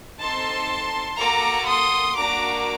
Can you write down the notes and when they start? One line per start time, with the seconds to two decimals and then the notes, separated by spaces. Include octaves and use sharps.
0.20 C4 D#4 A4 A5 C6
1.18 A#3 F#4 A4 A#5 D6
1.67 C6 D#6
2.17 A#3 D4 F#4 A#5 D6